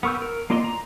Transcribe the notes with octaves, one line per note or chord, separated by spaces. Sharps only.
B3 A#4 C#6 E6 G6
A#4
A#3 F4 D5 D#5 C6
A#5